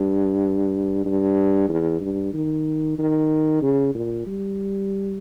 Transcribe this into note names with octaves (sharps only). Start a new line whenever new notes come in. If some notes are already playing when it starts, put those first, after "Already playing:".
Already playing: G2
G2
E2
G2
D#3
D#3
C#3
A#2
G3